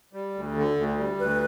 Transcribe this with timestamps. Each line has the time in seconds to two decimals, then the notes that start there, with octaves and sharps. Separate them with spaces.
0.13 G3
0.35 D2
0.56 D3
0.77 D2
0.98 G3
1.19 D2 B4